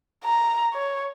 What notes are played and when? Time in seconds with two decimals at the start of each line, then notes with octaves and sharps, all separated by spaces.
0.24 A#5
0.73 C#5